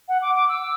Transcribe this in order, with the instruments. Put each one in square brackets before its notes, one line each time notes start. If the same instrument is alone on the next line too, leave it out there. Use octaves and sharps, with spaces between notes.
[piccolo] F#5
D6
D6
E6